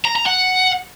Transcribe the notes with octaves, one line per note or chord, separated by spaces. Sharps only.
A#5
A#5
F#5